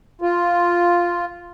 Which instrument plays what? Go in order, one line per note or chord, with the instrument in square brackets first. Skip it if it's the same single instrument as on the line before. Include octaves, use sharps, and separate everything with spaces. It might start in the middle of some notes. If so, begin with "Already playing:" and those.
[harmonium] F4